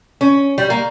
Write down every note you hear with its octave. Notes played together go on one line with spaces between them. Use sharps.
C#4
G3
A#3